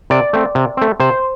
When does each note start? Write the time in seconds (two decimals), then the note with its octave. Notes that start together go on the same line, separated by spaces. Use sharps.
0.10 C3 D5
0.33 A3 C4
0.55 C3
0.77 A3 C4
1.00 C3 C5